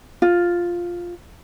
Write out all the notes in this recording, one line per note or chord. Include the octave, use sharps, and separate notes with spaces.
F4